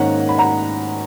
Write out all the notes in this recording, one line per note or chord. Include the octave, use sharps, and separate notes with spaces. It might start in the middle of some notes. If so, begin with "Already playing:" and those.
Already playing: G#2 D#3 A#3 C#4 F#5 A#5
B5
F#5 A#5